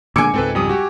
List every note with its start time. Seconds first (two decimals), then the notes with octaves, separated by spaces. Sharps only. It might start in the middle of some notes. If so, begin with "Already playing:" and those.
0.16 A#2 D3 G#3 G#5 D6 E6 G#6 C#7
0.34 C#2 G#2 C4 A4 B4
0.55 F2 G3 D#6
0.69 F#4 G4